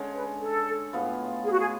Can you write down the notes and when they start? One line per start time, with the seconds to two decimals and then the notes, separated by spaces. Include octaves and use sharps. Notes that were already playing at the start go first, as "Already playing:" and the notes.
Already playing: D3 G#3 C#4
0.15 B4
0.41 A4
0.93 A2 G#3 B3 F4
1.45 G#4
1.52 F#4
1.59 G#4